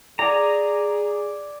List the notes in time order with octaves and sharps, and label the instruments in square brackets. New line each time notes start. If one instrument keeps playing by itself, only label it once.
[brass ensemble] G#4 [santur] D5 G#5 D#6 [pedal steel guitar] A#5